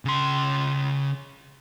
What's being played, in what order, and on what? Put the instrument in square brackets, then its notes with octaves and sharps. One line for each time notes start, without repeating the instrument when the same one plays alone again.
[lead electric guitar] C#3 C6